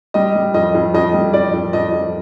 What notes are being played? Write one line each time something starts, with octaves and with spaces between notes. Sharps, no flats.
G3 D#5
G3
F2 D#5
F2
F2 D#5
G3
F2 D5
F2
F2 D#5
F2